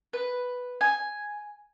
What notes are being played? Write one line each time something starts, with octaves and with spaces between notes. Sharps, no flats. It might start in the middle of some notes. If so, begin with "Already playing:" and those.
B4
G#5